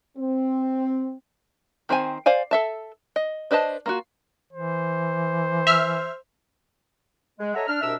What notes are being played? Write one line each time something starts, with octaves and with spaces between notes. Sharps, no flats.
C4
D#3 C4 C5 G#5
C5 D5 F5 G#5
A4 E5 A5
D#5
D4 B4 C5 D#5 A5
A#3 F4 F#4
E3 C5
E5 F6
G#3
A4 C#5 D#5 E5 F#5 A#5
D4 F6
C2 B2 D4 A#4 E5 E6